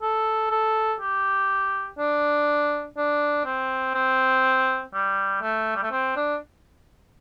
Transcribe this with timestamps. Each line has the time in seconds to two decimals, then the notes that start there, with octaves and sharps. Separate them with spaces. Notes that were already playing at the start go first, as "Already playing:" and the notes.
0.02 A4
0.50 A4
1.00 G4
1.98 D4
2.97 D4
3.45 C4
3.95 C4
4.94 G3
5.42 A3
5.76 G3
5.83 A3
5.92 C4
6.16 D4